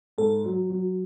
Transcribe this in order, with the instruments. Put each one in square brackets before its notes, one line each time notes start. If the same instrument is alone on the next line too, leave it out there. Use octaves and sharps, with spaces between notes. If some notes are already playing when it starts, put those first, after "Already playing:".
[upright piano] G#2 [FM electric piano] A4
[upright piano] F#3
F#3